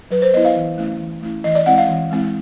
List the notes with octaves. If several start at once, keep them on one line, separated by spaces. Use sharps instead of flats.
F#3 B4
C5
B3 E4 D#5
F5
E3
A3 C#4 E4
E3
A3 C#4 E4
E3 D#5
D5
G#3 C4 E4 F#5
F5
E3
G#3 C4 E4